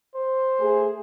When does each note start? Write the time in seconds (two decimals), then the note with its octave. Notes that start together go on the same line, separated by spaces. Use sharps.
0.15 C5
0.60 A3 G#4